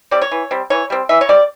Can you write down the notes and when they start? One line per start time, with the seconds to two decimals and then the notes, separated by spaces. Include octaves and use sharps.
0.11 G3 C4 D5
0.22 C#5
0.31 E3
0.51 G3 C4
0.70 E3 C#5
0.90 G3 C4
1.09 E3 E5
1.21 C#5
1.29 G3 C4 D5